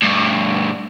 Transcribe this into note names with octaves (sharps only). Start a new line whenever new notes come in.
D2 G2